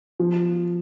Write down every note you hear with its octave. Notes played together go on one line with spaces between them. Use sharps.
F3